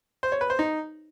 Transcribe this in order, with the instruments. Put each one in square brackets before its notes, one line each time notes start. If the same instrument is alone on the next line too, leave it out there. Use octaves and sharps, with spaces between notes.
[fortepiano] C5
C#5
B4
C5
D#4